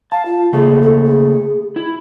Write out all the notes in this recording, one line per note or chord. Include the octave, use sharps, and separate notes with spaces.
F5 A5
F4
C#3 A3 A#3 G#4
A4
G#4
E4